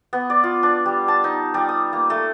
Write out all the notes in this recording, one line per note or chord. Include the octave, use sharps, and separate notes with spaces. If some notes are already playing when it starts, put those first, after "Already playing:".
B3
D5
F4
D4
G3
A5
D#4
G3
D#6
A#3
A3